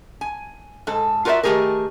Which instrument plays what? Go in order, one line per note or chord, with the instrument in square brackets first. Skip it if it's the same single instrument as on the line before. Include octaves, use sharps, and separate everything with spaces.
[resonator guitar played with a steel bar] G#5
G#2 A4
F4 F#4 A#4 C5 D5 E5
D#3 A3 A#3 G4 G#4 A#4